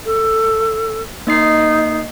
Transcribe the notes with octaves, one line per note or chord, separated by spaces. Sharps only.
A4
A#3 D#4 D#5 C7